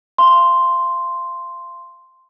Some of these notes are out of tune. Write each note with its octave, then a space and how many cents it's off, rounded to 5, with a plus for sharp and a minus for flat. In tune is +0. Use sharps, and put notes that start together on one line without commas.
F5 -35 C6 +0